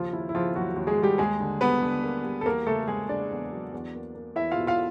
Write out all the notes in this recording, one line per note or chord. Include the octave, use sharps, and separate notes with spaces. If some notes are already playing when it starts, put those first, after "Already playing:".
Already playing: D#2 C#3 F3 F4
D#2 E4
E4
C#3 F3 F4
D#2 F#3 F#4
D#2
G#3 G#4
D#2
G3 G4
D#2 G#3 G#4
D3
G3 B3 B4
D3
A#3
G3
A4
E2 A#3 A#4
C#3 A3 A4
G#3 A3 G#4
C#3 D4 D5
E2
F#3
E2
A#3
A#3
E2 E4 E5
F4 F5
B2
F4 F5